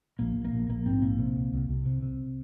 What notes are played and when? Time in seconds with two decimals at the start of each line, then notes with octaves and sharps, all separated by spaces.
0.19 A#1 A#3
0.36 A#1
0.45 A#3
0.53 A#1
0.69 A#1 A#3
0.86 G#2 C4
1.02 A#1 A#3
1.19 C3
1.36 C2
1.53 C2
1.69 C2
1.86 C3
2.03 C3